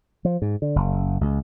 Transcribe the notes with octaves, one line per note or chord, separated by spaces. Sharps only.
F3
G#2
D3
F#1
C#2